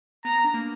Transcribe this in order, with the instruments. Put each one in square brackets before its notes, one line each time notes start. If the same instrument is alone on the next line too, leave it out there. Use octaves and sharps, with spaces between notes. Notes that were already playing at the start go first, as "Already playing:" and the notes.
[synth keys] B3 [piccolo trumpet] A#5
[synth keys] D4
A#3